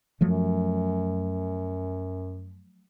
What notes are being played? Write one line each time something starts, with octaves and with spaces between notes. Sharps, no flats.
F#2 F3 F#3 A3